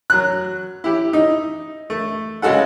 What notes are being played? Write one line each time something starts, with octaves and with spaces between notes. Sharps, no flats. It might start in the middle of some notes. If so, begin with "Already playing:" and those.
F#3 F#6
E4 G4
D#4
A3
C#3 G#3 F#4 A4 F#5